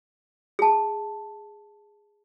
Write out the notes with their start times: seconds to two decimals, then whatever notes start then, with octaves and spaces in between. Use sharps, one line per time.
0.59 G#4 A5